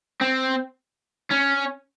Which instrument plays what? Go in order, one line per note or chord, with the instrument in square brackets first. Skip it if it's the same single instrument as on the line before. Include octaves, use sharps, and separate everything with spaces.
[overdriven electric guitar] C4
C#4